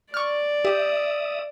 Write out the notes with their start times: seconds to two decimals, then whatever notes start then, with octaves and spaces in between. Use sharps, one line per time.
0.14 D5 C#6 F6
0.65 G4 E5 D#6